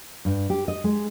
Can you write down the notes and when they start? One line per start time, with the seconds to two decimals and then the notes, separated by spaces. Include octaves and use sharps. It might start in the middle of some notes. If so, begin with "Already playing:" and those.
0.25 G2
0.50 G4
0.68 D#5
0.84 G#3